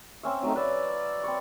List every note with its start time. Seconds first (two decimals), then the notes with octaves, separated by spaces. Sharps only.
0.23 C4 C#4 E5
0.43 F#3 A3 C4 D#4
0.56 B4 D5 E5
1.24 C4 B4 C#5